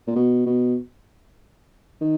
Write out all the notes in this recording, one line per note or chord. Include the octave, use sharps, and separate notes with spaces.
A#2
B2
B2
D#3